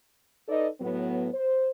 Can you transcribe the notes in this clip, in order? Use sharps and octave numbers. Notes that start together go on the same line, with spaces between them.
D#4 A4 B4 D5 D#5
A2 F#3 B3
C5